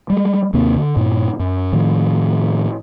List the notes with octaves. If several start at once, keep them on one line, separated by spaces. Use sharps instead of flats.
G3 G#3
D#2 C3 A#3 C4
D3
G2 A#2
F#2
A2 D#3 F3